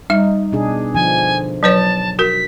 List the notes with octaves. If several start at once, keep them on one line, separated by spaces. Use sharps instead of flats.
G3 D#4 E5
B2 D4 G#4
D3 F3 D4 G#5
F#3 B4 C#5 A5
F#4 A#4 B6